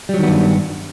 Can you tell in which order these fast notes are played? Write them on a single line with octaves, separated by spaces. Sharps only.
G3 F#3 D#3 B3 G2